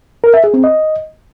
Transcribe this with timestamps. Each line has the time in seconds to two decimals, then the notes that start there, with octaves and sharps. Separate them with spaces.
0.24 A#4
0.34 E5
0.44 G#4
0.54 C4
0.64 D#5